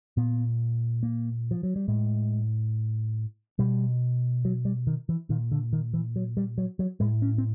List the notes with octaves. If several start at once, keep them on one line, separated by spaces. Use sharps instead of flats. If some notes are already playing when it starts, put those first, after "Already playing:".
A#2 B3
A#3
F3
F#3
G3
A2 G#3
B2 G3
F#3
G3
D#3
E3
A#2 D#3
D3
D#3
E3
F#3
G3
F#3
F#3
A2 G#3
C#4
C4